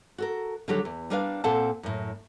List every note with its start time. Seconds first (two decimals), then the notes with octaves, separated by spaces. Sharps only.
0.18 F#4 A4 A#4
0.68 D3 D#3 F#3 G3 G4 A4
0.85 E2
1.10 G3 D4 A#4 B4 D5 F5
1.44 A#2 C4 A4 F5 F#5 A5
1.83 F#2 A2